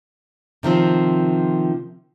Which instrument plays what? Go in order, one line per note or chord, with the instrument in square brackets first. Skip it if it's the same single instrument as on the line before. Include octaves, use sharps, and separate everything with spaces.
[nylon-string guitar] C3 D#3 F3 C4